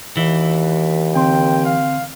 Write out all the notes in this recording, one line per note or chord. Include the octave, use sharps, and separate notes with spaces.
D#2 E3
D3 C4 G5 C6
F5